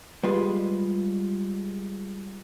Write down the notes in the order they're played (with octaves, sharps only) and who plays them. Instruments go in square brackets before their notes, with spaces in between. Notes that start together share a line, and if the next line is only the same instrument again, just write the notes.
[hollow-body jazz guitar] G3 G#3 F4 G#4 B4